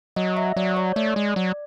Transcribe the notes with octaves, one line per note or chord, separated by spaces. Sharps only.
F#3 D#5
E5
F#3 D5
C#5
A3 D5
G#3
F#3